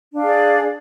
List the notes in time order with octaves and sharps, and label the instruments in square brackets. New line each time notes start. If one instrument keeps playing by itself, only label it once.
[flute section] D4
F5
G#4
D5